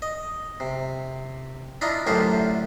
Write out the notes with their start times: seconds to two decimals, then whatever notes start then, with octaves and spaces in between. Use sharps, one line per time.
0.02 D#5
0.60 C3
1.81 D4 E4 F4 D#5 A#5
2.07 F#2 A2 D3 F4 G4 C5